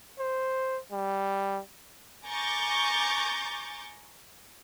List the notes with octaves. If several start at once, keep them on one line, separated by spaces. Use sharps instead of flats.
C5
G3
G#5 A#5 C#6 D6 G6 A6